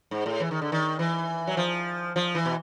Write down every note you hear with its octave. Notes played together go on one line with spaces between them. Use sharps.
G#2
A2
E3
D#3
D3
D#3
E3
F#3
F3
F3
E3
B2